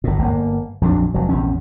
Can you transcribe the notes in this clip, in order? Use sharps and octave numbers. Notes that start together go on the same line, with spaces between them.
G1 A2
G1 A#3
A#1 F2 F#3 D4
F1 F#3
A#1 E2 C3 C#4